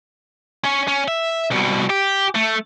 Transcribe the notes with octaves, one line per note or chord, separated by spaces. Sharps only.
C#4 C#5
C#4
E5
C2 B2
G4
A3